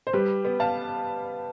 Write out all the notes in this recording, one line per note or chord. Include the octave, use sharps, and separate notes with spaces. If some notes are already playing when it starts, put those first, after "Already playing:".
C5
G3 G4 B4
B3
F5 A5